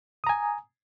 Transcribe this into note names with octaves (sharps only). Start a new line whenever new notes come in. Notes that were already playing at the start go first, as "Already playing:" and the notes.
G#5 A#5 D#6